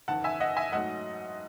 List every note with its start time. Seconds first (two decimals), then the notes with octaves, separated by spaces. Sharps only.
0.08 F#1 E2 D#3 F#5 A5
0.24 E5 G#5
0.40 D#5 F#5
0.57 E5 G#5
0.72 G#2 F#3 A3 D#5 F#5